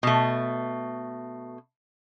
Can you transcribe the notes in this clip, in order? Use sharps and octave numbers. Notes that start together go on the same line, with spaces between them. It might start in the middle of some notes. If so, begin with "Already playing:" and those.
B2 A3